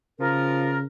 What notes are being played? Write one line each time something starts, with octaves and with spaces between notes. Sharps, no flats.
C#3 F3 F4 A#4